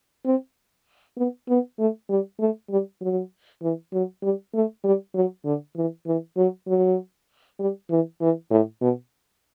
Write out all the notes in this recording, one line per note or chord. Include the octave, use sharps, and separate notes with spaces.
C4
B3
B3
A3
G3
A3
G3
F#3
E3
F#3
G3
A3
G3
F#3
D3
E3
E3
F#3
F#3
G3
E3
E3
A2
B2